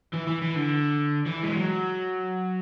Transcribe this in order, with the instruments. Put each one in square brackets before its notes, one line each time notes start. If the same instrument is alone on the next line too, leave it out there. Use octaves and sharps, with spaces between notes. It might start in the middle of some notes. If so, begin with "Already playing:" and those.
[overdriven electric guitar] E3
E3
E3
D3
E3
G#3
F#3